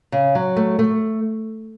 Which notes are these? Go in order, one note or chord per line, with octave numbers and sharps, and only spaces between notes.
C#3
F#3
A3
A3